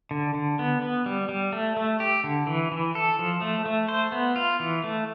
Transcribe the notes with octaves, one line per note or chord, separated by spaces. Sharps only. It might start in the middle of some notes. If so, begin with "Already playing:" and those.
D3
D3
B3
B3
G3
G3
A3
A3
G4
D3
E3
E3
A4
F3
A3
A3
C5
B3
F4
E3
A3